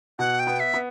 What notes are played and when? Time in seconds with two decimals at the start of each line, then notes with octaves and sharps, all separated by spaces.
0.19 B2 F#5
0.39 G5
0.47 B3
0.60 E5
0.74 B3